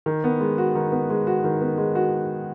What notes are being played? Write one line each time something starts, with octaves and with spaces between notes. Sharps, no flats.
D#3
B3
G#3
F#4
D#3
B3
G#3
F#4
D#3
B3
G#3
F#4